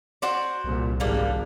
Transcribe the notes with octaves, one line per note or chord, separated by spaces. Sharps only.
F#4 C5 D5
C2 A#2
G#1 G3 A#3 D4